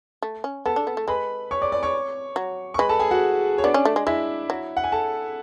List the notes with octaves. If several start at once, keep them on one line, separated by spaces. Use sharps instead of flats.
A3
C#4
B3 A4 A5
D4
B3
A3
G#3 B4 B5
C#5 C#6
D5 D6
D5 D6
C#5 C#6
F#3
C#6
G#3 B4 B5
A4 A5
G#4 G#5
F#4 F#5
C#5
B3 D4 D5
C#4
A3
G#3
G#3 E4 E5
F#3
F#5
G#5
A4 A5